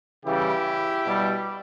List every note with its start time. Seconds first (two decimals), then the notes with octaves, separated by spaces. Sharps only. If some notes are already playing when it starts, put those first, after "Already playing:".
0.25 C#3 E3 G3 E4 G4
1.05 B2 G3